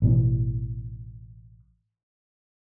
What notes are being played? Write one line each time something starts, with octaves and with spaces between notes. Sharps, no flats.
A1 B2 E3